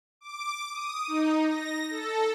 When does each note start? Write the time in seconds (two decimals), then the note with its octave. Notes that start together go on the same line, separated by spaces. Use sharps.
0.21 D6
0.71 D#6
1.08 D#4
1.44 A#6
1.90 A4